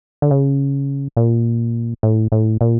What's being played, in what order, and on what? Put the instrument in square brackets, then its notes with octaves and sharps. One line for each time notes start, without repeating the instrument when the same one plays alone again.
[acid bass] D3
C#3
A#2
A2
A2
A#2